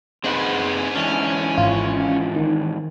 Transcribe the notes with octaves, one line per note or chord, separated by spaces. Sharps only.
C4 D#4 G#4 B4 F#5
G#2 E3 C#4 D4
G#1 F4
D#3